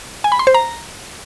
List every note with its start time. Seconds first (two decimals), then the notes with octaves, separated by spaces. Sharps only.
0.24 G#5
0.32 B5
0.39 C6
0.47 C5
0.54 A#5